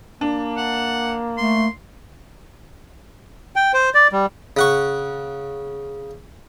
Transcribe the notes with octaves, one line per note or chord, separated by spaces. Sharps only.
A#3 D4
F#5
A3 C6
G5
C5
D5
G3
C#3 F#5 C#6